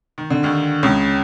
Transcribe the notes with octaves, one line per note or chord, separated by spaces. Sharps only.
D#3
D3
D#2 D#3
C#2 C#3